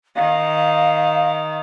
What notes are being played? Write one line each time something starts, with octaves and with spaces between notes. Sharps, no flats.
D#3 F5